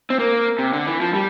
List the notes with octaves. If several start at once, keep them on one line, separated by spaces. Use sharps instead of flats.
C4
A#3
C3
D3
E3
F3
G3